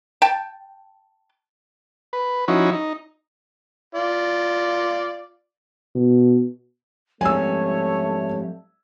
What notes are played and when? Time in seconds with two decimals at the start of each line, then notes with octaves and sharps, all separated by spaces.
0.22 G5 A5
2.13 B4
2.48 F3 C#4 D#4 E4 F#4
2.73 D#4
3.95 F4 D5
5.95 B2
7.21 F2 G#2 G3 A3 C#5 G#5 E6